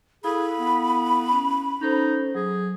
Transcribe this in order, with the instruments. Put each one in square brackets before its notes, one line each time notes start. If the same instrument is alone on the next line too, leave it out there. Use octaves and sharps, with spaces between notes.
[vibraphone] E4 A4 F5 [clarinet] G#4 [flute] B5
[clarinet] B3
[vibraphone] C#4
[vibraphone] C#4 A4 C5 [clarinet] D#4
[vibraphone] F#3 [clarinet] G#4